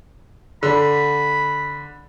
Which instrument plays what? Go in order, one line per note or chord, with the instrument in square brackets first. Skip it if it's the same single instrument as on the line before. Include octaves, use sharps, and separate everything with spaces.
[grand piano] D3 [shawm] B5